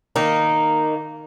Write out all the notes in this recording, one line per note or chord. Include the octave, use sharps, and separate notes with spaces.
D#3 A#3 D#4